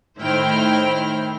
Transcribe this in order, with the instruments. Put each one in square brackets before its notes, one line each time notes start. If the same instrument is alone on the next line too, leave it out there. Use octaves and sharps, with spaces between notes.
[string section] A2 D#3 E4 C5 G5 F6